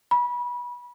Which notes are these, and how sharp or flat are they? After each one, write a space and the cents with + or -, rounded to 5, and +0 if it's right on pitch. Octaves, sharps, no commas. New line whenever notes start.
B5 -25